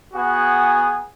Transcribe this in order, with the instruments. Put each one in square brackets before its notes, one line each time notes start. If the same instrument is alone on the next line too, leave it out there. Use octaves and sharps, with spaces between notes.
[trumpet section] B3 F#4 G#4 F#5 G#5